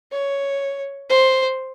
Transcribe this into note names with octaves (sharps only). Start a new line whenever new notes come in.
C#5
C5